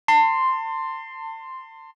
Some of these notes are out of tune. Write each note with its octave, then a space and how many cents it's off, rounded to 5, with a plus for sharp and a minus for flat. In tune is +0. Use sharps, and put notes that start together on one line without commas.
A5 +35 C6 +0